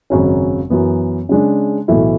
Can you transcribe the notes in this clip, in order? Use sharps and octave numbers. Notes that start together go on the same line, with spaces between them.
G#1 F#2 C#3 F#3 C#4
F#2 E3 B3
C#3 G#3 D4
B1 A2 E3 A3 E4